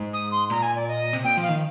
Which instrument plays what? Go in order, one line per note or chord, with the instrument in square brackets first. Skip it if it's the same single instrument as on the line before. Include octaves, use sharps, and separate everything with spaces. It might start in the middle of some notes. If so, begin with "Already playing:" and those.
Already playing: [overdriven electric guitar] G#2
[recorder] D#6
C6
[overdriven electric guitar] A#2 [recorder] A#5
[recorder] G#5
D5
D#5
[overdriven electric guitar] C3
[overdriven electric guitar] A#2 [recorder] G5
[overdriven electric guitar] F3
[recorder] F5
[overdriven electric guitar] D#3